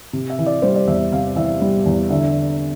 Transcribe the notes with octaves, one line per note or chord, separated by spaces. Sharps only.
C3
E5
E3
D5
G3 C5
D5
E2 E5
C3 F5
E3 E5
G3
E2
D3 E5